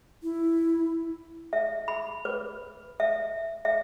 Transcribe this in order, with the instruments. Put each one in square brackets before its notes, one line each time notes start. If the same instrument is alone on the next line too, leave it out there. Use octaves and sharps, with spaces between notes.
[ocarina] E4
[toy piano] E5
B5
B4
E5
E5